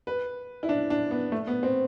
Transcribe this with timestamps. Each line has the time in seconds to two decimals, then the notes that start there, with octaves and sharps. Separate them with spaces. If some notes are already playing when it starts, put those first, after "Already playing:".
0.07 B4
0.63 E4
0.69 D4
0.90 D4
1.11 B3
1.32 A3
1.47 B3
1.63 C4